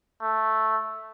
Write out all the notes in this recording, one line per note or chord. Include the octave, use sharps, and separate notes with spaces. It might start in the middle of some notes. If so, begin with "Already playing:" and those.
A3